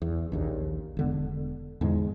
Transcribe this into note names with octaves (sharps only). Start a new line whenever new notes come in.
E2
A#1 D#2 A#2
E1 D3 B3
E2 G#2 D3 G#3